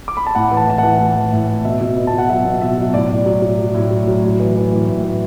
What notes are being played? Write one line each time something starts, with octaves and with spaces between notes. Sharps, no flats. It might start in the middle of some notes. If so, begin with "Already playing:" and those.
D6
B5
A5
A2 F#5
E3
A5
E3 A5
F#5
E3
A2
E3
A2
A2
B2 E5
B2
B2
A5
B2 F#5
F#3 E5
B2
B2 E5
F#3
A2 D5
A2
F#3
F#3
F#3
A2
F#3
F#3
A2
E3
E3
A2
A2
E3